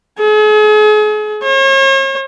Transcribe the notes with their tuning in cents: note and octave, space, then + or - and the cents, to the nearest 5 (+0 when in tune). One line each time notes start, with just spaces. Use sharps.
G#4 +40
C#5 -45